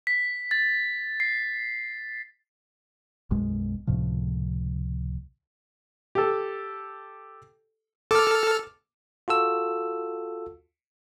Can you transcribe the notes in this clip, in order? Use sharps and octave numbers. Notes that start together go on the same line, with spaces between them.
B6
A6
C7
B1 F#2 G#3
C#2 A2 C3 F3
G4 A4
A4 D6 F6
F4 F#4 A4 E6